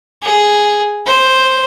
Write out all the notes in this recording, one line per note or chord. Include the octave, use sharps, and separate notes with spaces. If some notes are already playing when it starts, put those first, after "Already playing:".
G#4
C5